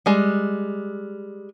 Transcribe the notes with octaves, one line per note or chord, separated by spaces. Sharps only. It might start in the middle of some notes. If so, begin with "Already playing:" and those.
G3 G#3